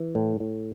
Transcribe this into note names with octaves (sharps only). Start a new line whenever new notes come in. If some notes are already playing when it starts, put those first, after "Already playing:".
Already playing: E3
A2
A2